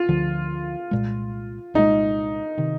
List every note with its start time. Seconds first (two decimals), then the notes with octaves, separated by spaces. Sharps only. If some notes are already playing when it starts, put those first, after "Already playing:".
Already playing: F4
0.09 D2 D3 F3
0.91 C2 A#2 G#3
1.74 C2 A#2 G#3 D#4
2.57 C3 D#3